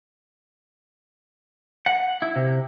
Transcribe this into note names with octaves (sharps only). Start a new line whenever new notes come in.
F#5
E4
C3